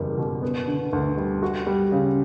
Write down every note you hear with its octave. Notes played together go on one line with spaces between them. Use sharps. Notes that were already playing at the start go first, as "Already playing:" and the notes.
Already playing: F#1 E2 G3
B2
B3
D3
D2
G3
F#4
G3
C#3